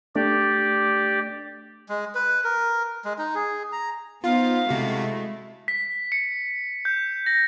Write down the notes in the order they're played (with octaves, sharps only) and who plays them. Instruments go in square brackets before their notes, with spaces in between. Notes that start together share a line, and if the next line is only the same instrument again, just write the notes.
[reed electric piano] A3 D4 [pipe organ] G4 D5
[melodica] G#3
B4
A#4
G#3
D#4
G#4
A#5
[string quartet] B3 D#4 C5 [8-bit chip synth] F4 [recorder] F5
[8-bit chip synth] C3 F#4 [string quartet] G#3 A3 E4
[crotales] B6
C#7
G6
A#6